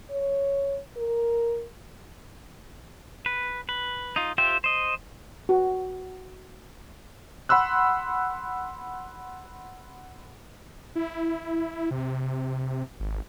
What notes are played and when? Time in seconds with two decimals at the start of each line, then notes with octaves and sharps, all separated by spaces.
0.10 C#5
0.97 A#4
3.26 B4
3.69 B4
4.16 D#4 F4
4.38 F4 G4 C5 E5 G5
4.64 C5 D#5
5.49 F#4
7.49 F#5 B5 C6 E6 F#6
10.95 E4
11.91 C3
13.00 G#1